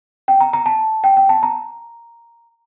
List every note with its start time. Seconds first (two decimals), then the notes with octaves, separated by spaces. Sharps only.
0.28 G5
0.41 A#5
0.53 A#5
0.66 A5
1.04 G5
1.17 G5
1.29 A5
1.43 A#5